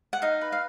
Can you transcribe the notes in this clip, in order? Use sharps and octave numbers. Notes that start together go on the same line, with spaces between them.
F#5
D#4 F5
B4
F5